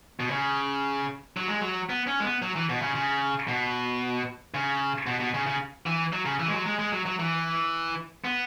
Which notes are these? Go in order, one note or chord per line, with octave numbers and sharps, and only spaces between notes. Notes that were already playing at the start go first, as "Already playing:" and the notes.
B2
C#3
F#3
G#3
F#3
B3
C#4
G#3
B3
F#3
E3
B2
C#3
C#3
B2
C#3
B2
B2
C#3
C#3
E3
F#3
C#3
E3
G#3
F#3
G#3
G#3
F#3
F#3
E3
B3